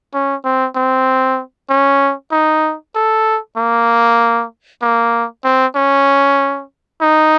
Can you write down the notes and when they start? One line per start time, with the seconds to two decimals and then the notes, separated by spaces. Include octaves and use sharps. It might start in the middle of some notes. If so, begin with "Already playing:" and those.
0.14 C#4
0.45 C4
0.76 C4
1.69 C#4
2.32 D#4
2.95 A4
3.57 A#3
4.82 A#3
5.44 C4
5.76 C#4
7.01 D#4